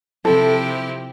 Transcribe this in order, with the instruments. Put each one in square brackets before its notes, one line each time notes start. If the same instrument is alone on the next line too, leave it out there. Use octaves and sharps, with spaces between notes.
[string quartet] C3 F3 C4 E4 G4 [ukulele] A4